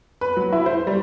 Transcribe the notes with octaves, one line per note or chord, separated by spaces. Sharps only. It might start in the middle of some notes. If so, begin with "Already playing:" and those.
B4
F#3
E4
C5
G3